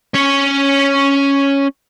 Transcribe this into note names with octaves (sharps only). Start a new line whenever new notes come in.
C#4 C#5